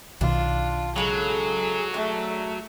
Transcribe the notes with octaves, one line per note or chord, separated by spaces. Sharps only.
B1 B2 D#3 D4 F4
C#3 F#3 G#3 G#4 A4
A3 D4